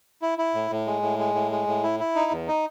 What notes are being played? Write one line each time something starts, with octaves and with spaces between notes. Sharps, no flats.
E4
E4
A2
A2
G#3
A2
G#3
A2
G#3
A2
E4
E4
D#4
E2
D#4